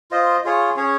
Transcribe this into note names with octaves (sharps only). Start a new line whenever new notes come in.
F4 C5 D#5
F4 G#4 C#5
C#4 G#4 C#5